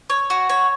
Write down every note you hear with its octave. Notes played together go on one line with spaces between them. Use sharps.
C#5
F#4
C#5